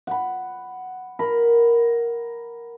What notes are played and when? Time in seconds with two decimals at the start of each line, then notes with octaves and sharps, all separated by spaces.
0.07 F#5 B5
1.19 A#4 B5